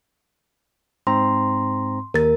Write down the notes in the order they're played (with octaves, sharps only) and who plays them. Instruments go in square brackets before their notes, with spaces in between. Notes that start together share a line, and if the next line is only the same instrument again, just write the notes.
[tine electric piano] G#2 C4 A#5 [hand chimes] C6
[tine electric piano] D#2 [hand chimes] A#4 A6